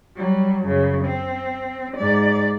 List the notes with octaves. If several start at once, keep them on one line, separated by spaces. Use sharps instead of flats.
F#3 G3
F#2 C#3
C4
G#2 D5